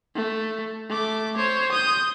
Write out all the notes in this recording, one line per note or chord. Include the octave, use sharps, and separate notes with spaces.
A3
A3 D6
C5 C#5
D#6 G6